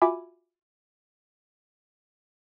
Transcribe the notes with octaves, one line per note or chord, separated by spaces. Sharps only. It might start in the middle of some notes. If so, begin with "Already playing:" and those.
F4 F#4 E5 G#5 B5 D6